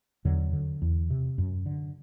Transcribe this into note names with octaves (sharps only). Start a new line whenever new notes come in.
E2 D3 F#3
D3
E2
C3
F#2
D3